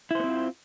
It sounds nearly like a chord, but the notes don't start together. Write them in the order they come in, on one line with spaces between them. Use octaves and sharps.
E4 C5 B3 C4 F4